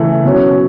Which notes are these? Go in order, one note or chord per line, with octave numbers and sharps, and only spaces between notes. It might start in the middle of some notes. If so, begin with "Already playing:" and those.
Already playing: C#3 E3 A3
B2 F#3 C#4